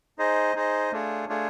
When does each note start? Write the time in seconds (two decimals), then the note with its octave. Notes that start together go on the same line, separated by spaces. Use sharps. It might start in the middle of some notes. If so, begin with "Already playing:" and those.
0.18 D#4 G#4 C5 D#5
0.55 D#4 G#4 C5 D#5
0.92 A3 D4 F4 G#4 C#5
1.29 A3 D4 F4 G#4 C#5